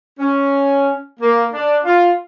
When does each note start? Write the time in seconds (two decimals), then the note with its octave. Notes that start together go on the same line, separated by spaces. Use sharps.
0.20 C#4
1.19 A#3
1.53 D4
1.85 F4